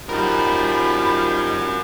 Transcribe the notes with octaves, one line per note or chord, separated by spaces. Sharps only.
D#3 F3 G3 F#4 A#4 B5